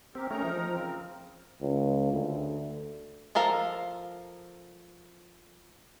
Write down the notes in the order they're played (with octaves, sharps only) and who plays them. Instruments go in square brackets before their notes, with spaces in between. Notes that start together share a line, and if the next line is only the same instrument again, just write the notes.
[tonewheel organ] C4 [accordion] G4 A#4
[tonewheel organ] A3 C#4 [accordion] D#4 A#4 A#5
[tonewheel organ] F3
[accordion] C#3 C4 A#4
[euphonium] C#2
D2
[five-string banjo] F3 A4 A#4 F5